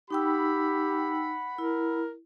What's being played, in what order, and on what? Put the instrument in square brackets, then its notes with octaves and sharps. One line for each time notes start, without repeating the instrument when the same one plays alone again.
[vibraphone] D#4 G5 E6 [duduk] G4 [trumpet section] F#5 B5
[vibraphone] E4 [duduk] A#4